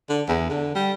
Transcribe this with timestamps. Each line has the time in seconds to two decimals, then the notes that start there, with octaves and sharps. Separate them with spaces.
0.09 D3
0.28 E2
0.51 D3
0.75 G3